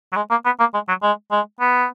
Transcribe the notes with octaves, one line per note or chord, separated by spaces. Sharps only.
F#3
G#3
A#3
B3
A#3
G#3
F#3
G#3
G#3
B3